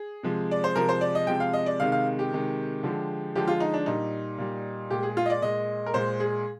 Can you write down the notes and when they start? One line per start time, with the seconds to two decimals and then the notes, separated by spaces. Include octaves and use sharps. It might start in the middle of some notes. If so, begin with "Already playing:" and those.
Already playing: G#4
0.23 C3 F3 G#3
0.51 D5
0.64 C5
0.76 C3 F3 G#3 A#4
0.89 C5
1.01 D5
1.15 D#5
1.27 C3 F3 G#3 G5
1.40 F5
1.53 D#5
1.66 D5
1.80 C3 D#3 G#3 F5
1.92 F5
2.19 G4
2.32 C3 D#3 G#3
2.83 D3 F3 G#3
3.35 D3 F3 G#3 G4
3.48 F4
3.60 D#4
3.74 D4
3.86 A#2 G3 D#4
4.38 A#2 G3
4.90 A#2 G#3 G4
5.03 G#4
5.17 F4
5.26 D#5
5.30 D5
5.42 A#2 G#3 D#5
5.86 A#4
5.94 A#2 G#3 C5
6.20 G#4